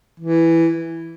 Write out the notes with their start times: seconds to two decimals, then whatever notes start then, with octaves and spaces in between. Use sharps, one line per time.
0.20 E3